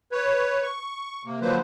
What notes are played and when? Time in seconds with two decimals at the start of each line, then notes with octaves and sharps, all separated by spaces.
0.12 B4 C#5
0.63 C#6
1.26 C3 A#3
1.41 D3 F3 F#3 A#3 B4 C5